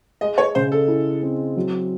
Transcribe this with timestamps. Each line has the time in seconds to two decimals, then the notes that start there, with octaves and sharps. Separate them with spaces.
0.21 G#3 D#5
0.38 C#5
0.55 C#3 C5
0.72 A4
0.88 E4
1.23 C4
1.56 F#3